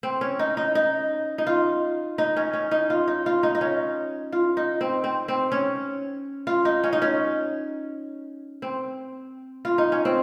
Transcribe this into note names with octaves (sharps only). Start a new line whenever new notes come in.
C4
C#4
D#4
D#4
D#4
D#4
F4
D#4
C#4
C#4
D#4
F4
D#4
F4
D#4
D#4
C#4
F4
D#4
C4
C4
C4
C#4
F4
D#4
C#4
D#4
C#4
C4
F4
D#4
C#4
C4